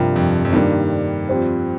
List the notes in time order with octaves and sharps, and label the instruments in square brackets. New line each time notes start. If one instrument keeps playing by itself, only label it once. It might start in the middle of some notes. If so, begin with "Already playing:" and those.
Already playing: [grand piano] G2 [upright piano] C3 F3 C4 G4 A#4
[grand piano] F2
F2
[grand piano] G2 [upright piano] D#3 G3 A#3 D4
[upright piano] F3 C4 G4 C5